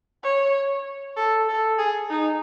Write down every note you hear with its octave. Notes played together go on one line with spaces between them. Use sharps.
C#5
A4
A4
G#4
D#4